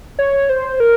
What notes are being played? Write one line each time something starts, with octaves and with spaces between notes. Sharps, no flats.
C#5
C5
A#4